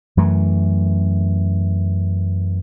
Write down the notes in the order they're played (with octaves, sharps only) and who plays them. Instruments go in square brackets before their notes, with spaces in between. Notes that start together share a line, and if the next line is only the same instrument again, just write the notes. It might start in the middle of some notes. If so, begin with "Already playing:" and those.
[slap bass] F#2 E3 A3